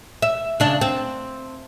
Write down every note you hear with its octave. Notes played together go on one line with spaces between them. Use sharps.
E5
C#3 D4
C4